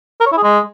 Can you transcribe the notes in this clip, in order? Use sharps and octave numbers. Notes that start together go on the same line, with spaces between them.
A#4
C#5
E4
G#4
G#3